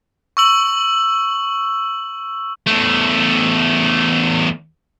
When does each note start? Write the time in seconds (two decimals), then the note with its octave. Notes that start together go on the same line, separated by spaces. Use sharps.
0.37 C#6 E6 F#7
2.67 E2 A3